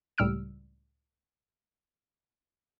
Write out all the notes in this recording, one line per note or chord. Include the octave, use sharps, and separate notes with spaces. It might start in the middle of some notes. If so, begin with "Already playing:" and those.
C#2 A2 G3 E6 F6 D7